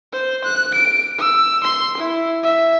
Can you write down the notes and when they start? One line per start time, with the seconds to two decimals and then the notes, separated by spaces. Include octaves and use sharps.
0.13 C5
0.44 F#6
0.74 D7
1.19 E6
1.64 C6
1.97 E4
2.44 E5